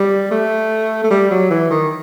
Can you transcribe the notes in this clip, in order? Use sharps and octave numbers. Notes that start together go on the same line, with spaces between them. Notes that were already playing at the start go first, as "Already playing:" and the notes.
Already playing: G3
A3
A3
G3
F#3
E3
D#3